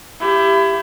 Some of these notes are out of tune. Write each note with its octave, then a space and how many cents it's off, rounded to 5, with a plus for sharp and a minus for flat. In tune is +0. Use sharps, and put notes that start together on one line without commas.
E4 +25 G4 +5